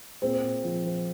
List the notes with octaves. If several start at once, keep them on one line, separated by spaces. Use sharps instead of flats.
A#2 G#3 C4
A#2
F3
F3